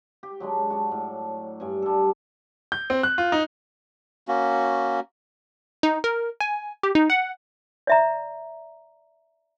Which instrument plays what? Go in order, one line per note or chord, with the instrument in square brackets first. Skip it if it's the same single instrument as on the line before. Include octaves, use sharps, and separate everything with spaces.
[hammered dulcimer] G4
F#3 G#3 D4
D4 F#4
A2
G2 D5 G#5
G3 A4
[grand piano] G6
C4
F#6
F4
D#4
[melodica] A#3 C#4 F#4
[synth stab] D#4
A#4
G#5
G4
D#4
F#5
[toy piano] D5 E5 A#5